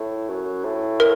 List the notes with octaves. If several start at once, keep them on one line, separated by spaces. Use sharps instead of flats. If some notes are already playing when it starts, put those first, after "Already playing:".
Already playing: A2
F#2
A2
A#4